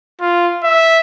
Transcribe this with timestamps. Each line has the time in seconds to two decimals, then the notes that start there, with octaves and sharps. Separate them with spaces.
0.21 F4
0.63 E5